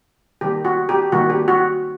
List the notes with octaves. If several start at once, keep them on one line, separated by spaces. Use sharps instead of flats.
D#3 G3 A#3 G4
F#4
G4
D#3 G3 A#3 F#4
G4
F#4